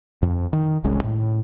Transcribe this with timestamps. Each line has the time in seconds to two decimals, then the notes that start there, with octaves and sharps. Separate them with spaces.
0.22 F2
0.53 D#3
0.84 F1 C2 G#3 C#4
1.04 A2